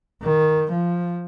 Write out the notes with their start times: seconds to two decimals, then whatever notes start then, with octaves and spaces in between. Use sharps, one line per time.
0.22 D#3
0.71 F3